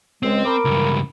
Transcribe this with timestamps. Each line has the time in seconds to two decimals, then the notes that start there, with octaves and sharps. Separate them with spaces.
0.23 C#2 G#3 C4
0.45 A#4 B5 D6
0.65 C#2 G2